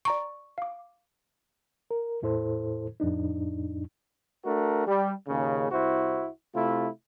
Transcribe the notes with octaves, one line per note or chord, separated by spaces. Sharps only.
D5 A#5 C#6 D7
F5 D6
A#4
E2 A2 E4 A4 C5
F2 A2 D4 D#4
A3 D4 F#4 A#4
G3
D#2 A#2 C#3
C2 E4 F#4 C5
C3 A3 E4 F4